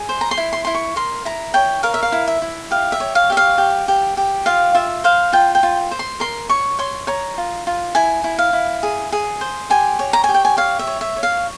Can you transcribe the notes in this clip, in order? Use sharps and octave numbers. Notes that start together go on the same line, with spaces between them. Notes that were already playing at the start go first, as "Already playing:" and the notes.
Already playing: G#4
C5
A#5
C6
E4
C6
E4 C6
C#6
A#4 C6
E4 A#5
C#5 G5
A#4 F5
E5
F5
E4
E5
E4
G4 F5
E5
C#5
F5
G4 E5
F5
G4
G4
G4
F4 F5
F4 E5
C5 F5
F4 G5
G5
F4
C5
C6
A#4 C6
C#5 C#6
C#5 C6
C#5 A#5
F4
F4
E4 G#5
E4
F5
E4
G#4
G#4
C5
G4 G#5
C#5
A#5
G4 G#5
G5
G#5
C#5 F5
E5
C#5
E5
C#5
F5